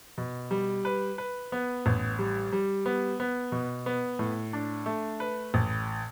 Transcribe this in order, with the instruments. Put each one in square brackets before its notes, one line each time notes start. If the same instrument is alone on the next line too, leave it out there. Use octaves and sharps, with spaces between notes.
[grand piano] B2
G3
B4
B4
B3
A1
G3
G3
B3
B3
B2
B3
A2
D4
A3
B4
A1